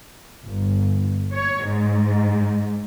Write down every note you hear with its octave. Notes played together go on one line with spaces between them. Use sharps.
G1
C#5
G#2